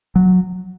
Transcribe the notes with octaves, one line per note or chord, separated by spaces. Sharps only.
F#3